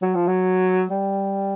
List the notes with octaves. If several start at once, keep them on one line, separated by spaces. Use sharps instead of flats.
F#3
F3
F#3
G3